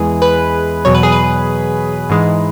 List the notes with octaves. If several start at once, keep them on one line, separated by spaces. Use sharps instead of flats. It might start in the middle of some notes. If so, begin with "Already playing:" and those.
Already playing: E2 E3 G#3 G#4
B4
E2 B2 F#3 C#5
B4
G#4
B4
G#2 E3 G#3